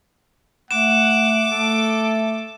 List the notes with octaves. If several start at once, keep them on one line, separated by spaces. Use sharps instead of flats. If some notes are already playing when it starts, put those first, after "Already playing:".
A3 F#5 D6 E7
A3 A4